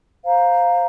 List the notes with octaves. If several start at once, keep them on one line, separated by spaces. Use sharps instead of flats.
C5 F5 A#5